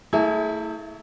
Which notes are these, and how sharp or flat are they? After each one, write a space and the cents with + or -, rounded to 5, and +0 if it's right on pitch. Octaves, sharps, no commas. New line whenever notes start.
A3 +40 E4 -20 G#4 +30